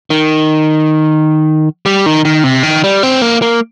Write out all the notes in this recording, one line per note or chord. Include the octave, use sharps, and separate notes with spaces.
D#3
G3
D#3
D#3
C3
D#3
G3
C4
A#3
A#3